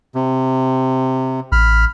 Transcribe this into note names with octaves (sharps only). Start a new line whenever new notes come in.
C3
A1 B5 F6